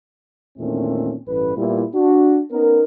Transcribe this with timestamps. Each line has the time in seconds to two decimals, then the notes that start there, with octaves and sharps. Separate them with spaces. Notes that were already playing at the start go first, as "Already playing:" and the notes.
0.58 E2 A#2 D#3 A3 C4 C#4
1.28 A1 G2 B4
1.56 A#2 G3 B3 E4
1.95 D4 F#4
2.51 B3 C#4 D#4 A#4